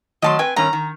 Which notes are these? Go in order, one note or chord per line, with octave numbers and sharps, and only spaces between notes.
D#3 F#3 A3 D#5 A5 C6
C4 B4 G5 G#5
G2 D#3 C#4 A#5
D#3